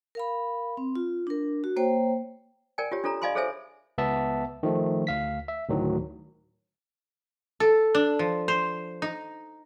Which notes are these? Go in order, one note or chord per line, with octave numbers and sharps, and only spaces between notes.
A#4 F5 B5
C4
F4
D4 A#4
F#4
A#3 C5 C#5 G5
A#4 D5 G5 G#5
F4 G4 C#5
D4 F4 A4 C#5 A#5
D5 D#5 F5 G#5 B5 C6
G#4 A4 C5 C#5 E5 G#5
C#2 B3 E5 A5
D#3 F3 A3
D2 F5 B6
E5
D2 A2 D#3 F#3
A4
D4
F3
C5
D#4